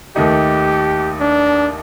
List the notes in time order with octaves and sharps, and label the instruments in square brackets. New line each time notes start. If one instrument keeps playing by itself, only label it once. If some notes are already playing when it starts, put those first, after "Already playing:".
[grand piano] D#2 D#3 A3 D#4 [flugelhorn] G4
[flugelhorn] D4